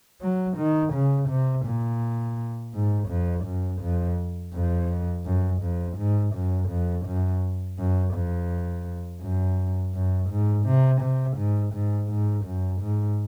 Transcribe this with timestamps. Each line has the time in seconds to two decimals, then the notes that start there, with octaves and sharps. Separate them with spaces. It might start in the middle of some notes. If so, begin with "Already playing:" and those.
0.22 F#3
0.57 D#3
0.93 C#3
1.29 C3
1.66 A#2
2.74 G#2
3.09 F2
3.45 F#2
3.82 F2
4.54 F2
5.25 F#2
5.62 F2
5.97 G#2
6.34 F#2
6.69 F2
7.06 F#2
7.78 F#2
8.14 F2
9.21 F#2
9.94 F#2
10.30 G#2
10.66 C3
11.01 C3
11.37 G#2
11.74 G#2
12.10 G#2
12.46 F#2
12.82 G#2